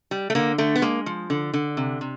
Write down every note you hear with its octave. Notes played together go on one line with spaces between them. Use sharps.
G3
A3
D3 A#3
D3 A3
B3
G#3 A#3
F3
D3
D3
C3
C3